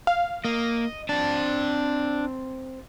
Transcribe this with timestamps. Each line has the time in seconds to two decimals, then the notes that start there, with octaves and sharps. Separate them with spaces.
0.07 F5
0.45 A#3 D#5
1.09 C4 D4 A5